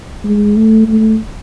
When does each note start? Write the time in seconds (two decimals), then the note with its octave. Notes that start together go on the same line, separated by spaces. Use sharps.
0.24 G#3
0.56 A3
0.88 A3